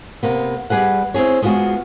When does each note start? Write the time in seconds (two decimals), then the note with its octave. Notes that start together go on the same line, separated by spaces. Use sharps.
0.23 C3 A#3 B3
0.70 G3 G#4 B4 F#5
1.14 C4 E4 G#4 C#5
1.42 G#3 B3 F4 F#4 G#4